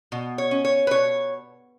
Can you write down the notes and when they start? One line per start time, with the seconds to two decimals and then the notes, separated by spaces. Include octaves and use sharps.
0.12 B2
0.38 C#5
0.51 C#4
0.65 C#5
0.87 B4
0.91 B2 C#5